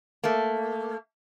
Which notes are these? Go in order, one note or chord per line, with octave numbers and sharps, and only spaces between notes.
A3 A#3